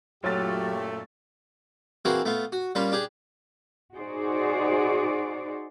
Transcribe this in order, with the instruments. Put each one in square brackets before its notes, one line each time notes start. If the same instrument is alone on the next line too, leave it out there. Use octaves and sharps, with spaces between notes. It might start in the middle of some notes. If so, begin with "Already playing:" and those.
[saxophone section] F#2 A#2 A3 [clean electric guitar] F#3 F4 [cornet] G4 [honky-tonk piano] C#5 A6
[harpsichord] E3 A#3 C4 F#4 G#4
A3 B3 F4
F#4
G3 A#3 C#4 F4 B5
D4 G4 G#4
[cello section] D#4 F#4 G#4 C5 D5